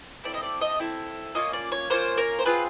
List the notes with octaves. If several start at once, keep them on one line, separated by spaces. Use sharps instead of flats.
C4 E4 A4 D5
D#5
D5
D#5
C4 E4 A4
A#3 C#4 F4 D#5
D5
C#5
A#3 C#4 F4 C5
A#4
C5
C4 F4 G#4 B4